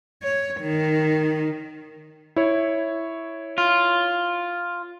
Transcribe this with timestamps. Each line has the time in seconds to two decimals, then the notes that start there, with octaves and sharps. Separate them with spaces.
0.23 C#5
0.62 D#3
2.36 E4 C#5
3.58 F4